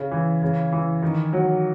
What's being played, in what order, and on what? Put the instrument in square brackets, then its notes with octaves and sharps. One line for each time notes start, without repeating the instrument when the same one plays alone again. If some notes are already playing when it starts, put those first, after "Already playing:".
Already playing: [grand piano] C#3
E3
C#3
E3
D#3
F#3